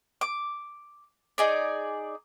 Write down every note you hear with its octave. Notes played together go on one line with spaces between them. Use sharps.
D6
D#4 G#4 D5